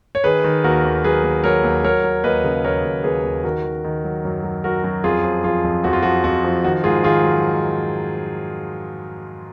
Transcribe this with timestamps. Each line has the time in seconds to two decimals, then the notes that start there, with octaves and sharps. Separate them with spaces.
0.15 C#5
0.24 D#3 G#4 B4
0.44 D#3
0.64 D#2 F#4 A#4
0.85 D#2
1.04 F#3 G#4 B4
1.24 D#2
1.44 F#3 A#4 C#5
1.64 D#2
1.84 F#3 A#4 C#5
2.04 F#3
2.24 D#2 B4 D#5
2.44 C#3
2.64 D#2 A#4 C#5
2.84 D#2
3.04 D#2 G#4 B4
3.24 D#2
3.44 D#3 F#4 A#4
3.64 D#3
3.84 D#3
4.04 F#3
4.25 F#2
4.44 F#3
4.64 F#3 F#4 A#4
4.84 F#2
5.04 F2 F4 G#4
5.24 F3
5.44 F3 F4 G#4
5.64 F2
5.84 F2 F#4
5.93 F4
6.03 F3 F#4
6.24 F2 F#4
6.44 F3
6.64 D#3 F#4
6.84 G#2 F4 G#4
7.04 D#3 F4 G#4
7.24 F#3